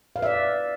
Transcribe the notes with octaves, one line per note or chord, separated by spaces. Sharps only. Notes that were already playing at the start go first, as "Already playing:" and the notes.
B4 D5 E5 F5